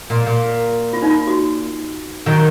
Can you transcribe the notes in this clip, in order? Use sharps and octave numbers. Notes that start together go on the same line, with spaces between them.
A#2
A#2
F4
D#4
F4
F#4
D#3 F#3